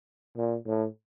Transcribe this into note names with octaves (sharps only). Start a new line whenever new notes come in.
A#2
A2